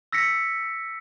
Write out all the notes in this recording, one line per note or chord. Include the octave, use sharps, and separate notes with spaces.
E6 A#6 B6 C#7